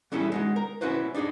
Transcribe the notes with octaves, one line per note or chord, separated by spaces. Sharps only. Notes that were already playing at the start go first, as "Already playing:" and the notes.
E3 G3 C#4 E4 G#4 A4
G#3 D#4 F#4
A#4
C#4 E4 F#4 B4 C5
D4 D#4 F#4 G#4 D#5